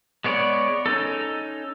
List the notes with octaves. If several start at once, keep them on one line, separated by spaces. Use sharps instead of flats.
G#3 B3 C#5 D5
C#4 D#4 A4